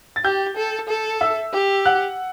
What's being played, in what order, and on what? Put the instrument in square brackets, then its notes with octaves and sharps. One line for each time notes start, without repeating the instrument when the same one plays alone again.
[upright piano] A6
[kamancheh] G4 [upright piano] G5 G6
[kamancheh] A4
A4
[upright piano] E5 E6
[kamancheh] G4
[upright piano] F#5 F#6